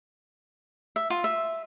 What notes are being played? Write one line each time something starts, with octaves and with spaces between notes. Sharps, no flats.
E5
F4
E5